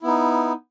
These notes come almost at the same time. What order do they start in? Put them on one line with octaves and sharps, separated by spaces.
E4 B3 D#4